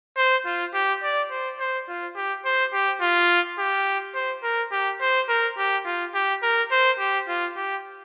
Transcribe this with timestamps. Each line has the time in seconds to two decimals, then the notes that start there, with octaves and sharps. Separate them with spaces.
0.17 C5
0.46 F4
0.74 G4
1.03 D5
1.31 C5
1.59 C5
1.89 F4
2.16 G4
2.45 C5
2.73 G4
3.01 F4
3.59 G4
4.15 C5
4.43 A#4
4.72 G4
5.01 C5
5.29 A#4
5.58 G4
5.86 F4
6.14 G4
6.43 A#4
6.71 C5
7.00 G4
7.28 F4
7.57 G4